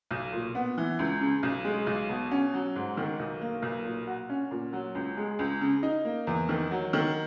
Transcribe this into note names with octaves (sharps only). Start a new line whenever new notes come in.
B1
A#2
B3
E3
C#2
C#3
B1
G#3
B1
B2
C#4
F#3
G#2
D#3
B1
A#3
B1
A#2
F#4
C#4
A#2
F#3
C#2
G#3
C#2
C#3
D#4
A#3
E2
D#3
F#3
D#3